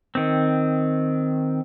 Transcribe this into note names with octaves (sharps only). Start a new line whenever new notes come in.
D#3 C4